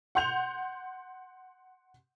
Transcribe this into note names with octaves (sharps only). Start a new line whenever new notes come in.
F#5 C6 G6 F7